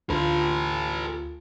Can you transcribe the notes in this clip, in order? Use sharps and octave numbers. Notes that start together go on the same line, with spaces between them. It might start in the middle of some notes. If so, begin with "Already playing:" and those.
D2 F4 A4 B4